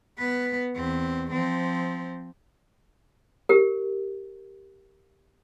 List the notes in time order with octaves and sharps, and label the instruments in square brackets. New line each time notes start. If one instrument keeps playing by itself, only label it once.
[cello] B3 B4
E2 C4
F3 C4
[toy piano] G4 A#4